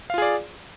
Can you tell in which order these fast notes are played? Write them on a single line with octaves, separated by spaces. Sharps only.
F5 F4 G#4 D5